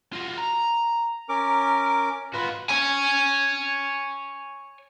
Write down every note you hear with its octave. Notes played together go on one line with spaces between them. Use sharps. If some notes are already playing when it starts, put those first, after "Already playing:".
F4 F#4
A#5
C#4 A#4 D6
G#2 F4 F#4 B4
C#5 G#5